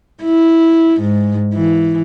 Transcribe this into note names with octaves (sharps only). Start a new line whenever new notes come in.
E4
G#2
E3